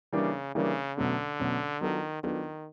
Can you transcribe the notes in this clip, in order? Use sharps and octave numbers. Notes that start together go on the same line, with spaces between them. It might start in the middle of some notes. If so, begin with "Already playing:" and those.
C#3 E3 G3 A#3 D4
C#3 E3 G3 A#3 D4
B2 D3 F#3 A3 C#4
B2 F#3 A3 C#4
D#3 F#3 B3 D4 F4 A4
D#3 F#3 B3 D4 F4 A4